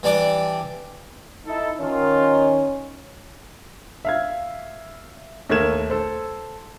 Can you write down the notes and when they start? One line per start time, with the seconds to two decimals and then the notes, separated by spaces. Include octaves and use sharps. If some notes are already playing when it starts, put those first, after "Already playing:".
0.03 E3 G3 D4 D5
1.46 D#4 E4 A4
1.80 D#3 C#4 D#4 F4
4.05 E5 F5 G#6
5.49 D#2 A3 A#4 G#6 E7
5.90 A4 C5